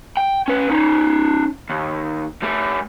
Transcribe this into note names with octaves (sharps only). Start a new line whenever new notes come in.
G5
C#4 B4
C#4 D#4
D#2
A3 G4